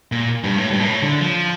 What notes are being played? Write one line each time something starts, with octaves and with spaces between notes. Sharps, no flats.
A#2
G2
A2
G2
A#2
A2
D3
F3